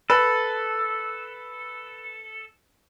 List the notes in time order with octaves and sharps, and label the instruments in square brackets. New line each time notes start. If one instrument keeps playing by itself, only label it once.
[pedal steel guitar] A4 [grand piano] B4